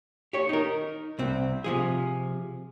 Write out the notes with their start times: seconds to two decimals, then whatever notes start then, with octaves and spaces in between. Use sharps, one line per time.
0.33 G4 C#5
0.49 D#4 A#4
1.19 C2 C4
1.64 C3 F3 G#4